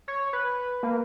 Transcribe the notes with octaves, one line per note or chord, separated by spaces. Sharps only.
C#5
B4
A#3